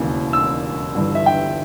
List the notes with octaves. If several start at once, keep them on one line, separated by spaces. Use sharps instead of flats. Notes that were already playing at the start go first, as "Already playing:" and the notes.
Already playing: E1 D#2 C#3 E3
E6
G1 G2 E3
E5
G5